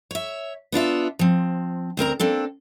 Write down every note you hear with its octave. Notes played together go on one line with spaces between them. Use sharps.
C#5 E5
B3 D4 F4 E5
F3 C4
D2 C4 A#4 A#5
A#3 C4 D4 A4